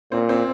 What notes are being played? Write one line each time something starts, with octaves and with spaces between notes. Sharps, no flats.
A#2 C4
C4